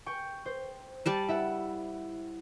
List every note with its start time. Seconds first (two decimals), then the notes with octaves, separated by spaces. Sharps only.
0.06 G5 C#6
0.46 C5
1.06 G3 D5 A5
1.28 E4 E5 F#5